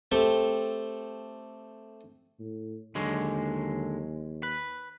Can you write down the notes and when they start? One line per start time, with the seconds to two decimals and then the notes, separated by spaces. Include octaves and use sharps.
0.12 A3 C4 G4 A4
2.39 A2
2.95 D#2 D3 F#3 G#3
4.43 B4